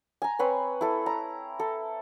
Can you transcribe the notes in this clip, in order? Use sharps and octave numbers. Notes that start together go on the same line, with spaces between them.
G#5 A#5
C4 B4 C#5
E4 A4
A#5
A4